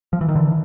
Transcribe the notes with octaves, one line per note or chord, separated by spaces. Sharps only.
F3
E3
D#3
D3 E3